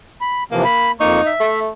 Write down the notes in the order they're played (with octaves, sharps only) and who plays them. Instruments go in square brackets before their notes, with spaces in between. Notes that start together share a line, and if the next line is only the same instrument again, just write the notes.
[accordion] B5
[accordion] C3 E3 F3 [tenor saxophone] A#3
[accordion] B5
[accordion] F2 A#3 C#6 [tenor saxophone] D#4
[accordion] E5
[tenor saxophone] A3